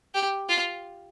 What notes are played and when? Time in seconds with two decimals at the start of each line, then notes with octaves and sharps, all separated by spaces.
0.14 G4
0.49 F4